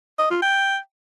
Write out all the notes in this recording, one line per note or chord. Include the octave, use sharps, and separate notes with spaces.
D#5
F4
G5